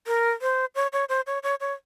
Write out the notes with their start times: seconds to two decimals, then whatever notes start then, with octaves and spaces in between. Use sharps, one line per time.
0.07 A#4
0.42 C5
0.75 C#5
0.93 C#5
1.09 C5
1.27 C#5
1.43 C#5
1.61 C#5